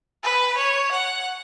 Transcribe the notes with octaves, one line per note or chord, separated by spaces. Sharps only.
B4
C#5
F#5